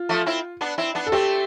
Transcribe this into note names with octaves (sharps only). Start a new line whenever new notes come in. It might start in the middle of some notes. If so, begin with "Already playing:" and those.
Already playing: F4
F3 A3
C4 E4
B3 D4
C4 E4
B3 D4
A4
A3 C4 G4